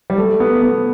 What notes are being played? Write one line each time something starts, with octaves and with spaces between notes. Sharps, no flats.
G3
A3
B3
B3